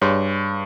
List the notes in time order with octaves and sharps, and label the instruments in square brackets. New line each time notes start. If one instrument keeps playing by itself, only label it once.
[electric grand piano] G2 [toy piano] G#4 C#5 G#5 C6